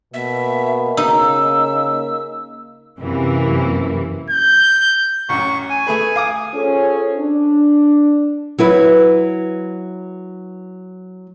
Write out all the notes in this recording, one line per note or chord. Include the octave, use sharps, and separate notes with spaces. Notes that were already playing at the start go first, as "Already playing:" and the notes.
B2 A#3 E5
C#3 D#4 E6
F#2 C3 E3 A#3 E4
G6
A1 F#2 C#6
G#5
A3 G#4 B4
F5 D6 D#6
C#4 F4 G#4 A4 C5 C#5
D4
F#3 E4 B4